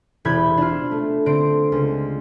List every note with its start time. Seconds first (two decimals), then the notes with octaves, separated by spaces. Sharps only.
0.25 E1 C3 E4 B5 G6 G#6
0.57 D4 F4
0.91 A3
1.26 D3 C4 C5 D7
1.72 C#2